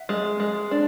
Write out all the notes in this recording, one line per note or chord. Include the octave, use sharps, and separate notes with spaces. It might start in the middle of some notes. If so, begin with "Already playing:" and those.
Already playing: E5 F#5
G#3
G#3
D4